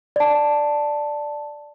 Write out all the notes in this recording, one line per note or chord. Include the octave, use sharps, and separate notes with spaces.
D5 A5